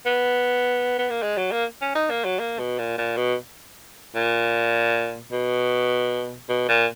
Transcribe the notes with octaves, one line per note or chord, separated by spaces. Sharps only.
B3
B3
A#3
G#3
F#3
A#3
C#4
D#4
A#3
F#3
A#3
B2
A#2
A#2
B2
A#2
B2
B2
A#2